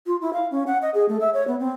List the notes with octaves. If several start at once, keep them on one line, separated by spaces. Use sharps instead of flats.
F4
E4
F5
C#4
F#5
D#5
G#4
A3
E5
C#5
B3
C4